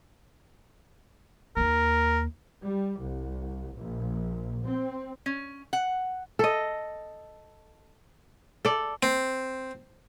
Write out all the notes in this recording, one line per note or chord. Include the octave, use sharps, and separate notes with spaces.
D#2 A#3 A#4
G3
C2
A#1
C4
C#4
F#5
A4 D#5
A4 D5
C4